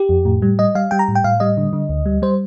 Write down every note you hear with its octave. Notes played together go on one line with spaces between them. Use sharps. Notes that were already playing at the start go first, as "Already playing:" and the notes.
Already playing: G4
F2
A2
G3
G3 D#5
G3 F5
G3 G5
A#5
A2
G5
A2 F5
G3 D#5
D3
D3
D2
G3
G3 C5